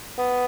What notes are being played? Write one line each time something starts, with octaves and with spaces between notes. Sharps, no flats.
B3